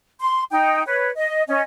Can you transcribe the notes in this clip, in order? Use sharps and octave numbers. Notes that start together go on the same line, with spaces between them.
C6
D#4 G5
B4 C#5
D#5
C#4 D#5